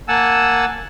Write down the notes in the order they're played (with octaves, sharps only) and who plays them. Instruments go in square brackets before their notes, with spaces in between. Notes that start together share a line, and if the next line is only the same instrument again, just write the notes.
[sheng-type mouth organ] A#3 F#5 G#5 A5 E6